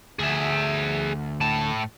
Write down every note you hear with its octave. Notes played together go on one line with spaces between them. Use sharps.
D2 G#4 E5
A2 A5